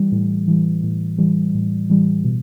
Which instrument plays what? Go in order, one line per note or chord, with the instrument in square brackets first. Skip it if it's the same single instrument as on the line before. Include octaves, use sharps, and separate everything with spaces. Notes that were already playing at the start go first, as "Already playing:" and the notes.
Already playing: [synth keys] E3 G3
A2
E3 G3
A2
E3 G3
A2
E3 G3
B2